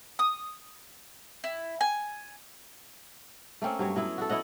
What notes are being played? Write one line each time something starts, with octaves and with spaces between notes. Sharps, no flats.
D#6
E4
G#5
A3 A#3 C4 C#4
G2 F#3 C#5
F#3 B3 E4
F#4 A4
E4 C#5 D#5 F#5